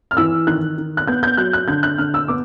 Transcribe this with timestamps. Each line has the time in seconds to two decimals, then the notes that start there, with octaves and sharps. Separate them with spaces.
0.11 F6
0.17 E3 E6
0.47 D#3 F#6
0.78 D#3
0.97 F#6
1.07 B3 G6
1.23 G6
1.37 F#3 F#6
1.53 F#6
1.68 D3 G6
1.83 F#6
1.98 D3 F6
2.14 E6
2.28 B3 D6